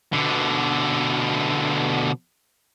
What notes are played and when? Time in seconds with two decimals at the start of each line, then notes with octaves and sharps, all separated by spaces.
0.13 B2 D3